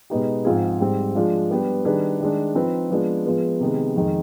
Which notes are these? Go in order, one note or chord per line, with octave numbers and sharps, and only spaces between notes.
B2 G#3 B3 D#4 G4
G#2 F3 C4 F4 G#4
G#2 G3 C4
F3 G#3 D4 F4
G3 B3 D4 G4 B4
D#3 G3 D4 G#4 B4
D#3 G#3 D4
F3 C4 D#4 B4
F3 G#3 B3 D4
F3 G#3 B3
C3 D#3 G#3 B3
F2 D#3 G#3